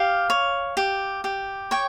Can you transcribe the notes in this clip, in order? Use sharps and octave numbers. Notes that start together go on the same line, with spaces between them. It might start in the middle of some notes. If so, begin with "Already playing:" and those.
Already playing: G4 F5
C#5
G4
G4
C#5 G5